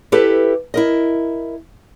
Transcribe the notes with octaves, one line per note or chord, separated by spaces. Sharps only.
E4 G4 A4 B4
E4 A#4 D#5